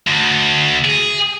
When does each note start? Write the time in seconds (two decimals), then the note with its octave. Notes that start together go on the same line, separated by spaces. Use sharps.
0.07 D2
0.84 G#4